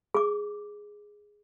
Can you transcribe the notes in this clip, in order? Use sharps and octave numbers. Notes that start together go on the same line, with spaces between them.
G#4 D6